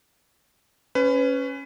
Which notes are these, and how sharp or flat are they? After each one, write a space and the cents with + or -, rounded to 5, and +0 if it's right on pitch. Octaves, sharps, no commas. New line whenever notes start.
C#4 +0 B4 +25